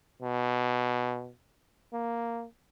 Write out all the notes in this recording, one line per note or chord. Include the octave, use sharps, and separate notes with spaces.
B2
A#3